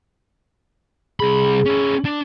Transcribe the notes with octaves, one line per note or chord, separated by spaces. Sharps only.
C2 G#4 B5
C#4 E4
D4